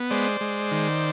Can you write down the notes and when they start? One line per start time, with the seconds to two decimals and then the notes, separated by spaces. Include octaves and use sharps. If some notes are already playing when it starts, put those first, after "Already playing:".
Already playing: B3
0.10 G#3 C5 D5
0.41 G#3
0.71 D#3